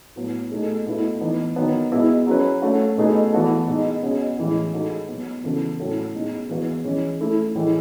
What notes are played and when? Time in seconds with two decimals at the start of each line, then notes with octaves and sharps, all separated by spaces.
0.16 A2 F#3 B3
0.52 B2 A3 D#4 G#4
0.87 B2 A3 E4 B4
1.21 E3 B3 D#4
1.56 D#3 F#3 B3
1.92 B2 G#3 B3 E4
2.27 F#3 C#4 G#4 B4
2.62 A3 C#4 F#4
2.97 B2 A3 D#4 G#4 B4
3.33 E3 B3 F#4 A4
3.67 B2 G#3 D#4
4.03 B2 G#3 C#4 G#4
4.38 A2 E3 G#3
4.73 G#3 D#4 F#4 A4
5.08 B2 F#3 B3
5.44 C#3 E3 B3 F#4 A4
5.79 A2 F#3 C#4 F#4 A4
6.15 B2 G#3 D#4
6.49 E3 G#3 B3 F#4 B4
6.84 E3 G#3 C#4
7.20 A3 E4 A4
7.55 A2 E3 G#3